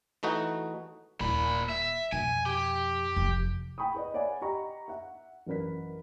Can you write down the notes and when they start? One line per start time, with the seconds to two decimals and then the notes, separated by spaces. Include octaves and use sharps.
0.23 E3 A3 D#4 F#4
1.20 D#1 A#2 E4 B5
1.69 E5
2.12 F2 B2 G#5
2.46 G4
3.16 F1 F3
3.78 F#5 G5 B5 C#6 D#6
3.94 G#4 B4 D#5
4.14 C#5 D5 E5 F#5 G#5 B5
4.42 G4 D#5 F#5 A#5 B5 C#6
4.88 E5 F#5
5.47 A1 F#2 A#4 B4 B6